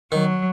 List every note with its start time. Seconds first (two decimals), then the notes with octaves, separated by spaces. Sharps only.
0.12 D#3 F#3